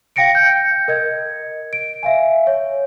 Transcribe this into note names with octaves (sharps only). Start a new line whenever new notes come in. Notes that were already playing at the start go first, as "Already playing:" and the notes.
F5 G5 A#6 C#7 D7
G6 C#7
A#4 D#5 G#6
D7
E5 F5 G#5
C#5